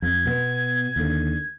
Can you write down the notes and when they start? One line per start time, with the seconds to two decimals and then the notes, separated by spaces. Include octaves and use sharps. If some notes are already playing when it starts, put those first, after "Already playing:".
0.02 F2 G#6
0.25 B2 B3
0.96 D#2 D3